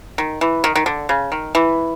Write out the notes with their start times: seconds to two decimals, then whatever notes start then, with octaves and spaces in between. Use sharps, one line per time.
0.18 D#3
0.41 E3
0.64 D#3
0.75 D#3
0.86 D3
1.09 C#3
1.32 D#3
1.55 E3